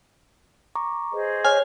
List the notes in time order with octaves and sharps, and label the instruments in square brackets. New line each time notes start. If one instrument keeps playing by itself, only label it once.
[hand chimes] A#5 C#6 D6
[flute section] G#4 C5 D#5 [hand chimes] B4
[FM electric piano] C#5 F6 [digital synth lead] G#5